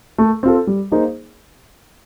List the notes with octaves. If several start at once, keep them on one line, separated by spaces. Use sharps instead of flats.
A3
C4 F4 A4
G3
A#3 D#4 G#4 C5